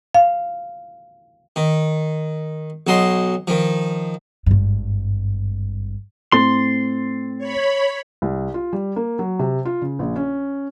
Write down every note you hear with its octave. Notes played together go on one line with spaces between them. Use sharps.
F5
D#3
B1 F#3 D#5 C6
D#3 F3
G#1 G2
A2 C4 C6 A6
C#5 B5
C2
F4
G3
A#3
F#3
C3
F4
C#3
A#1
C#4